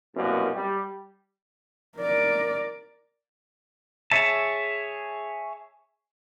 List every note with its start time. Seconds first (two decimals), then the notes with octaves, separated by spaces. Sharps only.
0.15 C2 F#2 B2 G3 A#3
0.54 G3 G4
1.98 A#4 D5
4.11 G#4 C#5 E5 A5